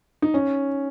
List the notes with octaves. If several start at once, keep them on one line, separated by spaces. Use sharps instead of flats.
D#4
C#4